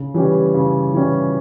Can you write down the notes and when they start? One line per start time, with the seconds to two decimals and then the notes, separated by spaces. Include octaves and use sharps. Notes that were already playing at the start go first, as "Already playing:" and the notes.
Already playing: C#3
0.14 E3 G3 C#4 G4
0.54 C#3
0.94 E3 G3 C#4 G4